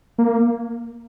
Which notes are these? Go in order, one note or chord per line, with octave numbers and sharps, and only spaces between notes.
A#3